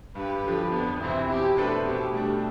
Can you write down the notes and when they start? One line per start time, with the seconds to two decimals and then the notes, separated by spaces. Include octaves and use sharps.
0.15 G2 G4 B4
0.44 D3 F3
0.72 F2 B3 D4
1.01 C3 E3 C4 E4
1.28 B2 E4 G4
1.57 A3 D4 G4 A4 B4 C5
1.85 B2 E4 G4
2.13 G3 A3 D4